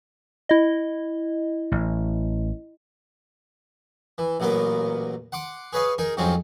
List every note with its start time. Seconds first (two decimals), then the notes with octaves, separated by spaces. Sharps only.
0.49 E4 D#5
1.72 A1
4.18 E3
4.40 A1 A#2 F#3 B3 A#4
5.32 F#5 C6 D6
5.73 G#4 B4 C#5 D#5 F5
5.98 D#4 G#4 A#4
6.17 F2 G#2 F#3 C4 C#4 F4